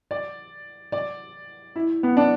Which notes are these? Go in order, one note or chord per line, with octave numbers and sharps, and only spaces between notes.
D5
D5
E4
B3
D4